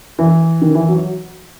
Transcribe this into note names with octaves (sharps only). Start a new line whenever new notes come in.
E3
D#3
E3
F#3